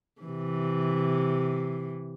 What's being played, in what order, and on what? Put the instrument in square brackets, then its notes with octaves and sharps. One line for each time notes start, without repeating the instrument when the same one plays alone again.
[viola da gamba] C3 E3